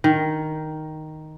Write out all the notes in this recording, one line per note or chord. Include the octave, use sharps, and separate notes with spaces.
D#3